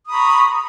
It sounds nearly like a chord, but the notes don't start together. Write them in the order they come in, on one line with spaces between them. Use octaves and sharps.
D#6 B5 A#5 C#6